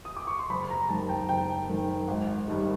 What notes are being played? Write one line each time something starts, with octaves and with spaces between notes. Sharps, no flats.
D#6
D6
C#6
C6
F#1 B5
A#5
F#2 D#3 A5
G5
F#1 G5
F#2 D#3
G#1
G2 D#3